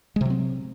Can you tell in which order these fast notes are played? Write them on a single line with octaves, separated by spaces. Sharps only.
G#3 C3 F#3 C4